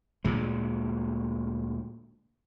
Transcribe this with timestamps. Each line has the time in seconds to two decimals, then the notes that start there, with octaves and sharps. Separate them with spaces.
0.24 D2 A#2 G#3